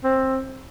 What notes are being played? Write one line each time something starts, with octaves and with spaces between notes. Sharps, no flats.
C4